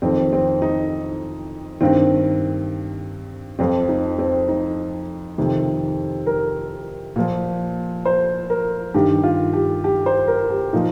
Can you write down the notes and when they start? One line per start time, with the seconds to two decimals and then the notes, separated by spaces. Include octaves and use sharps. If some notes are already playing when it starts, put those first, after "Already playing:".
0.02 F2 D#3 C4
0.33 C4
0.62 D#4
1.81 G2 D#3 C4
3.59 F2 F3 C4
3.89 D#4
4.18 C4
4.48 D#4
5.38 F2 C3 D#3
6.27 A#4
7.16 A#2 F3
8.05 C5
8.50 A#4
8.94 G2 D#3 G4
9.23 F4
9.53 G4
9.84 G4
10.06 C5
10.28 A#4
10.50 G4
10.73 A#2 F3 D#4